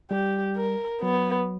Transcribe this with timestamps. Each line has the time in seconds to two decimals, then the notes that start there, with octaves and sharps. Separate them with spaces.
0.11 G3 G4
0.56 A#4
1.02 F#3 B3